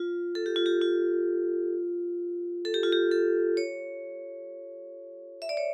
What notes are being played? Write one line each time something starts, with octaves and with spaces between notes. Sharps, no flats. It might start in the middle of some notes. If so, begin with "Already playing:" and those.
Already playing: F4
A4
G4
F4
G4
F4
A4
G4
F4
G4
A4
C#5
E5
D5
C#5